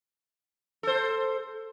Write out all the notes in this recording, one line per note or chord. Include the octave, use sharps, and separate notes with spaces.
A4 C5